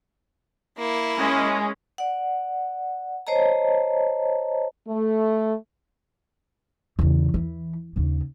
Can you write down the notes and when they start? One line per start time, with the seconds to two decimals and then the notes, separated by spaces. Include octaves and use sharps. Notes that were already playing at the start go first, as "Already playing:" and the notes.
0.78 A#3 E4
1.16 G#3 C#4
1.98 D5 F#5
3.27 C5 C#5 D#5 A5 A#5
4.87 A3
6.99 E2 C#3
7.34 E3
7.96 D#2 C#3